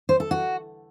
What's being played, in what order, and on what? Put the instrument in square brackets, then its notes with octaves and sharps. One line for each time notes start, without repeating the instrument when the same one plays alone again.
[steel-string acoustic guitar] C5
A4
F#4